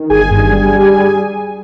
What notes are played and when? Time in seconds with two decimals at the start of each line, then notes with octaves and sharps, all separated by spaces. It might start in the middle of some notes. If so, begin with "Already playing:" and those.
Already playing: D#3
0.10 G1 G#4 G#5
0.31 G2
0.51 G3
0.72 G3